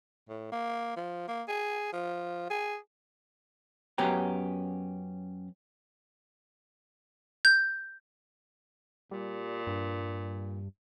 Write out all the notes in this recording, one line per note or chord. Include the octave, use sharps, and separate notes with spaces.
A2
A#3
F3
A#3
G#4
F3
G#4
F#2 B3 C#4 G4 A#5
G6
A#2 G3
G2